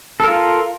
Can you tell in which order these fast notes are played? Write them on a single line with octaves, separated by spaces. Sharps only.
A4 A#4 F4